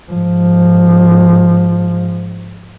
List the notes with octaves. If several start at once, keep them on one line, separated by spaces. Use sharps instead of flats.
G#2 F3